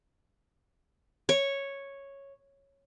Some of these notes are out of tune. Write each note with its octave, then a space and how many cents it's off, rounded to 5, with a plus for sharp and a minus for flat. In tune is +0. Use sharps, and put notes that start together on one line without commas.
C#5 -5